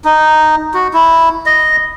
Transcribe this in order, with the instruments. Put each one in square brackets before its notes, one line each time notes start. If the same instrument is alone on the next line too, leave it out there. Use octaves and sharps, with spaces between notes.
[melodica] D#4
F#4
E4
D#5